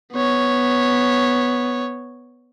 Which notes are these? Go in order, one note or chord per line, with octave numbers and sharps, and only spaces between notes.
B3 C#5